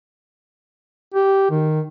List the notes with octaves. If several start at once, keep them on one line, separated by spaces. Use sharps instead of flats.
G4
D#3